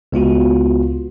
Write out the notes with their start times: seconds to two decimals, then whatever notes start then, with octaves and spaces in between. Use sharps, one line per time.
0.12 C#2 B3 F4 F#4